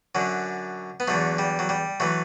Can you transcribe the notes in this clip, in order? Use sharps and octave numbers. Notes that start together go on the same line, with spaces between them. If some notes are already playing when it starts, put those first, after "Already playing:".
F#2 D3 F#3
B3
E2 D3 F#3 A3
G3
F#3
G3
E3 F#3 A3